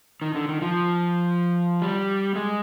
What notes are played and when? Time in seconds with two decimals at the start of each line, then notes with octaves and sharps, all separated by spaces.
0.22 D#3
0.35 D3
0.49 D#3
0.62 F3
1.82 G3
2.36 G#3